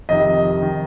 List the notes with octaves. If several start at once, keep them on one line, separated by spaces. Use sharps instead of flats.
F2 C3 D#3 D#5
D#3